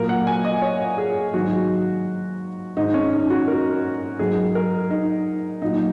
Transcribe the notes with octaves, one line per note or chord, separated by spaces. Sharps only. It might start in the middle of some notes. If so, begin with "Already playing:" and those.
Already playing: A#2 F#3 A#4
F#5
G#5
D#5
C#5
G#4
G#2 D#3 F#3 F#4
G#2 D#3 G#3 D#4
C#4
D#4
F#4
A#4
G#2 F#3 G#4
A#4
D#4
A#2 F#3 D#4